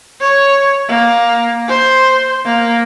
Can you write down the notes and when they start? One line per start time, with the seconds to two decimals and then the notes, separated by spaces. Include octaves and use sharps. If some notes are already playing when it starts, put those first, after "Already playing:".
0.21 C#5
0.88 A#3
1.68 C5
2.45 A#3